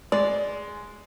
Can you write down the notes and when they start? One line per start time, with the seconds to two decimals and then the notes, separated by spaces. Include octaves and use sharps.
0.12 G#3 D5